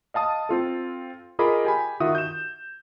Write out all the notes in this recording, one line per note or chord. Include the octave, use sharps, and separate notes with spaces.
D#5 F5 A5 D#6
C4 F4 A4
F4 G#4 A#4 D#5 B5 D6
G4 G#5 B5
D#3 F4 F#4 E5 D#6
G6 E7